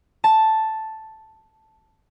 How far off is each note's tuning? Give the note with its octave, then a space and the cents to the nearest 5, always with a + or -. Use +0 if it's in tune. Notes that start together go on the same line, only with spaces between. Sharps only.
A5 +0